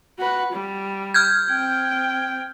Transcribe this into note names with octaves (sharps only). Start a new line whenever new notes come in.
F#4 B4
G3
F6 G6 G#6
C4 G5